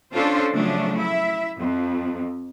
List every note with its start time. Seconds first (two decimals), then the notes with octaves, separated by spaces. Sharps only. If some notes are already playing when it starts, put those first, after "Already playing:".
0.13 C#4 D4 F4 A4 C5
0.52 C#3 F3 F#3 A3 C#4 D4
0.97 E4 E5
1.58 F2